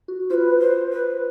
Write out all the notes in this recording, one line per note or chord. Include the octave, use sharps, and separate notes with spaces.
F#4
F4 B4 C5
C5
B4